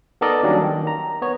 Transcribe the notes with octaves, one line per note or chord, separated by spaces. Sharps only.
B3 D#4 A4 A#4 D5 D#5
D#3 F#3 G3 A#3 C#4 D4
D#3
A#5
B3 C#5